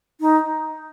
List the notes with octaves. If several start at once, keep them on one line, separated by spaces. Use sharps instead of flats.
D#4